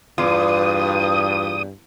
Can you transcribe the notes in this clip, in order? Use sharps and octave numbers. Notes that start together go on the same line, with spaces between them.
E2 G2 F4 F5 D6 D#6